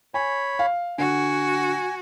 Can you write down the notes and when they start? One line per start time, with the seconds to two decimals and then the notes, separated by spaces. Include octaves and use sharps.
0.14 C#5 G#5 B5
0.59 F5
0.98 D3 F#4 F#5 G#5